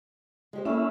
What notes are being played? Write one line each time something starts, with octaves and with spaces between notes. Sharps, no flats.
G#3 G4 C5
A#3 C#4 D4 E4 A4 E5